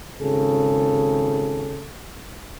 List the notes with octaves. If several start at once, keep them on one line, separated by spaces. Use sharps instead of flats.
G#1 C#3 G#4 A4